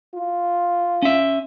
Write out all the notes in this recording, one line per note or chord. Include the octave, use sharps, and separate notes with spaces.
F4
C#4 E5